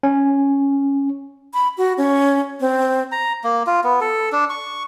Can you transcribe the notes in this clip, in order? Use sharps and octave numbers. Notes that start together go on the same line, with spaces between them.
C#4
B5
F#4
C#4
C4
A#5
A#3
F4
B3
A4
D4
C#6